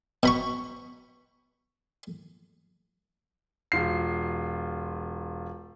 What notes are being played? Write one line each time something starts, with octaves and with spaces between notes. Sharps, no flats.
B2 B5 C#6
E1 F4 C7